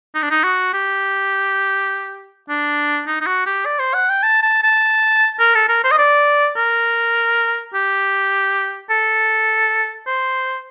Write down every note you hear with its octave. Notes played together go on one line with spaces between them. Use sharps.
D#4
D4
D#4
F#4
G4
D4
D#4
D#4
F#4
G4
D5
C5
F#5
G5
A5
A5
A5
A#4
A4
A#4
C5
D#5
D5
A#4
G4
A4
C5